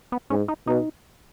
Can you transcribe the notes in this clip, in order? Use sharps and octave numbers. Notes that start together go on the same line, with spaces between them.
B3
G#2 C#4
D#4
B2 D#4